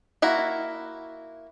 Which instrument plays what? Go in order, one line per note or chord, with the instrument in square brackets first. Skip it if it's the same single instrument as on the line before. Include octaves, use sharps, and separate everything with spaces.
[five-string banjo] A#3 E4 F#4